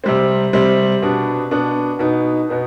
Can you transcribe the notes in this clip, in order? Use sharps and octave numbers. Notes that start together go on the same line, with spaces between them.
C3 G3 C4
C3 G3 C4
B2 B3 D4
B2 B3 D4
B2 B3 D#4
B2 B3 D#4